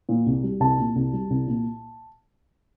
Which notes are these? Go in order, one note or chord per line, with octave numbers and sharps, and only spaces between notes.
A#2
C2
G3
C2 A5
A#2
C2
G3
C2
A#2